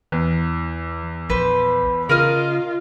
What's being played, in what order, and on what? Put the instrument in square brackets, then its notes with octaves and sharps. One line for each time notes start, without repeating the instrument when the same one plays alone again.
[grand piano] E2 [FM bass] E3
[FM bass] A#1 [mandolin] B4 C5
[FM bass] C#3 [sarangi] F4 [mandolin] A#4 D#5 F5